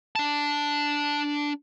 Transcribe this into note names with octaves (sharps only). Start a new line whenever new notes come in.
D4 A5